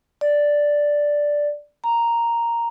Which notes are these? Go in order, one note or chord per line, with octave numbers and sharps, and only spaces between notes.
D5
A#5